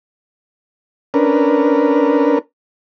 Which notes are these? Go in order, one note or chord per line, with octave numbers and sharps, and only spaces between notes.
C#4 D4 A#4 B4